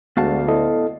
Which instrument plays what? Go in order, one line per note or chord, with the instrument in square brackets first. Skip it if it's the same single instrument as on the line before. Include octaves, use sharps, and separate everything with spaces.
[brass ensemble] D2 [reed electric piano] G#3 F#4 [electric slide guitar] B3 F5 A5
[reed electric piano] E4 A4 D#5